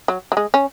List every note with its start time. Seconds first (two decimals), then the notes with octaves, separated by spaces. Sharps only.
0.08 F#3
0.32 F#3
0.37 G#3
0.54 C#4